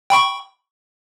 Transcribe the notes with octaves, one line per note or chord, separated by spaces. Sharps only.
G5 B5 C#6